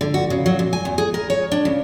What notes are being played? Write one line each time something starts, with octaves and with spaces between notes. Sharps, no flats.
D3
F#4
C#3
F#3
A#2
G#5
E2
G#4
A#4
C#5
D4
C#3